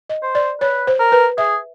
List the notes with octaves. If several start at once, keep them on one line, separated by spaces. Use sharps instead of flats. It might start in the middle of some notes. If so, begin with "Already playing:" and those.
D#5
C5
D5
B4 C#5
C5
A#4
B4
G#4 E5